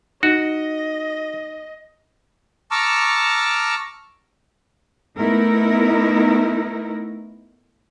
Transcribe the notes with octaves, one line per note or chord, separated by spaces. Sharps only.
D#4 F#4 D#5
A5 A#5 C#6 D6 E6 F6
A3 B3 D#4 E4 A#4